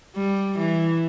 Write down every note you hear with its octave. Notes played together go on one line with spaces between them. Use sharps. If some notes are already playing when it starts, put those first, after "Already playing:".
G3
E3